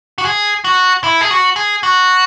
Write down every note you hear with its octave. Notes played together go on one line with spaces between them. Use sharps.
F#4
G#4
F#4
E4
G#4
F#4
G#4
F#4